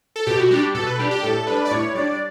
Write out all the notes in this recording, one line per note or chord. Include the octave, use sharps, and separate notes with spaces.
A4
B2 G4
F#4
G3 D4 G4
B2 A4
B4
G3 D4 G4
G4
A2 A4
G3 D4 B4
D5
A2 C#5
G3 D4 D5